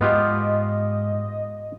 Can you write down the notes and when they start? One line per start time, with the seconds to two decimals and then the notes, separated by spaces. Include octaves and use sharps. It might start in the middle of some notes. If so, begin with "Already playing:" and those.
0.01 G#2 B3 F4 G4 D#5